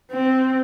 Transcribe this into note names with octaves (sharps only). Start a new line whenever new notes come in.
C4